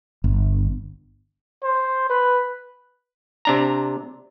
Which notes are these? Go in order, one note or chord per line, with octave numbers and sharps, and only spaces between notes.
G1
C5
B4
C3 D4 A#5